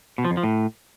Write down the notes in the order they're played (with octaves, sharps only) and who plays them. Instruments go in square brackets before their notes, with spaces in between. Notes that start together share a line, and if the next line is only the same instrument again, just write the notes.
[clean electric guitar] B2
F3
F2
F3
A2